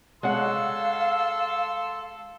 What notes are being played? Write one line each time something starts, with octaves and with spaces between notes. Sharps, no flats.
G#3 A4 C#5 F5 F#5 C6 E6